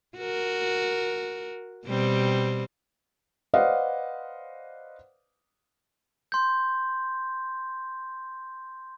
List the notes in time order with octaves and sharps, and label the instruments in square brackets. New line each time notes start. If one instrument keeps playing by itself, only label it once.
[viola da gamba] F#4 A#4
B2 G3 C4
[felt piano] B4 C5 D5 D#5 F5 F#5
[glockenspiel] C6 G6